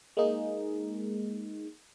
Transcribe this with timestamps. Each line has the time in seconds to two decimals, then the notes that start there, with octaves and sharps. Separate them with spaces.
0.17 G#3 A#3 D#4 G#4